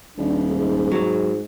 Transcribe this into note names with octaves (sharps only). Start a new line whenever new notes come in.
D#1 D4
G#2
F#3